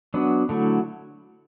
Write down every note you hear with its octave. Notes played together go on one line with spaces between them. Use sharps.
F#3 B3 D4
D3 F#3 A3 E4